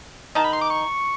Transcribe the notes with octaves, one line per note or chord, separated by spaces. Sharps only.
D#3 D#4 A5
B5
C6
D6
C#6